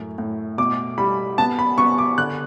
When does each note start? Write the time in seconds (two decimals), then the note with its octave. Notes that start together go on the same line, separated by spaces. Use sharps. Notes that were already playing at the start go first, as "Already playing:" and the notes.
Already playing: F#2 A2
0.18 A2
0.58 B2 D6
0.98 G3 B5
1.38 B3 A5
1.59 B5
1.78 B3 C#6
1.98 D6
2.18 D3 F#6